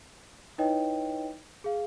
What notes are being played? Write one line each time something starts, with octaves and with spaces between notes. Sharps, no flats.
D#4 E4 B4 C#5 D#5 G5
G#4 F5